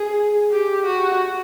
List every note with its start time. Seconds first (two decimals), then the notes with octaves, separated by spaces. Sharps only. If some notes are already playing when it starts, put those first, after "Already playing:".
Already playing: G#4
0.51 G4
0.86 F#4